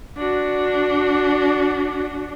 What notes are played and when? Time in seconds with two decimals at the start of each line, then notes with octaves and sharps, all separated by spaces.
0.17 D4 F#4